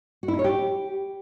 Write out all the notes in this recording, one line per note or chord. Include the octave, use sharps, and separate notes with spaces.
F#4
E4
D#4
C#5
G4